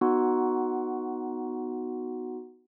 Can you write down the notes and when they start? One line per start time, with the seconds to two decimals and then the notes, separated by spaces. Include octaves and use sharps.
0.01 B3 D#4 F#4 F#5 C6